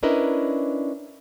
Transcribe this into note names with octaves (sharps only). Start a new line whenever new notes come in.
C#4 D4 E4 A#4 B4 D#5